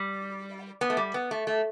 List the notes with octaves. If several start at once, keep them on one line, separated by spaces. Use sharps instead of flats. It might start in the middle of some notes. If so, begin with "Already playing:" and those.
Already playing: G3
B3
A3
G3
B3
A3
A3